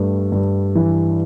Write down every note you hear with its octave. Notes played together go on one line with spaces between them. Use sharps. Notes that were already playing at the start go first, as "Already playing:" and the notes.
Already playing: G2 A3
G2
E3